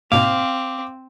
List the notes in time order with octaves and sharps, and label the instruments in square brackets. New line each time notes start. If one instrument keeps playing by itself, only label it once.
[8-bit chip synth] G#2 B2 A#3 [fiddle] C4 [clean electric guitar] F5 [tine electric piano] D6